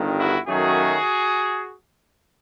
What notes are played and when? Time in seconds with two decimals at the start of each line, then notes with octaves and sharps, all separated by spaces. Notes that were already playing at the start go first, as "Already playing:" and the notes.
Already playing: G1 G2 D#3
0.18 E4 F#4
0.48 F#2 D#3 F#3 A3 F#4 G#4